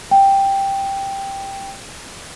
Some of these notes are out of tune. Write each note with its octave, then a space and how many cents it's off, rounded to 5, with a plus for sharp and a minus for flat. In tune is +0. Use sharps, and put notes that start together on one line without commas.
G5 +5